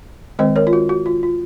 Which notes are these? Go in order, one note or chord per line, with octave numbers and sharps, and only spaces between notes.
D#3 G#3 C4 C5 D#5
A#4 C#5
F4
F#4
F#4
F4
F4